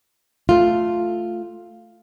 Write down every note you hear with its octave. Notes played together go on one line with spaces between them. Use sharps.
A3 F4